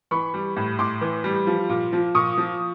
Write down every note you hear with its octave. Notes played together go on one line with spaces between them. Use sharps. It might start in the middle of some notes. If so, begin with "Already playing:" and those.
E3 B5 C#6
G3
A2
A2 C6 D6
E3
G3
F3
A#2
F3
A#2 C#6 D#6
F3